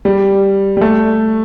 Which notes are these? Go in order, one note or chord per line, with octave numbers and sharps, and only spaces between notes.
G3
G3
A3